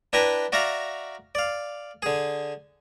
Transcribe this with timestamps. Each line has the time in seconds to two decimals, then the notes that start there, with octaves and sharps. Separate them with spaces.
0.13 D4 E4 B4 E5 G5 A#5
0.52 F#4 D5 E5 F5 A#5
1.35 D5 F5
2.02 D3 G#4